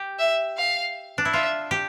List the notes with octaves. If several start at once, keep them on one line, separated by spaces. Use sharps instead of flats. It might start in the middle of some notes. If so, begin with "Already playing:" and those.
Already playing: G4
E5
F5
D4
E4
F4 E5
G4